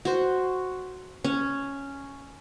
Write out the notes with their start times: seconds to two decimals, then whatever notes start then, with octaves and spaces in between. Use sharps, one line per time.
0.05 F#4 C5
1.24 C#4